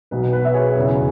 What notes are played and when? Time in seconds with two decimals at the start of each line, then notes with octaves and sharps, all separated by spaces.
0.11 B1 B2 F#3 B4
0.33 B4
0.45 E5
0.54 G#4 C#5
0.75 E1 E2 C#3 G#4